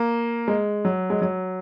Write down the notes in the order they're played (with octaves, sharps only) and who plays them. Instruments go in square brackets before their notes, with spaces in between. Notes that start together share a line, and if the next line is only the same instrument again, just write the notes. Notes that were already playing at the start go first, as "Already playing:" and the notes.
Already playing: [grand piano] A#3
G#3
F#3
G#3
F#3